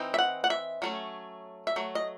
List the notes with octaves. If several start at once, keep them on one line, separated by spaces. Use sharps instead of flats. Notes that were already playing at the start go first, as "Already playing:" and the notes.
Already playing: E3 C4 D#4
E5
F#5
F#5
E5
F#3 A3 C#4
E5
F#3 A3
D#5